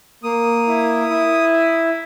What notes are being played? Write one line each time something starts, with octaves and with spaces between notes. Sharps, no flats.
A#3 D#6
E4
E4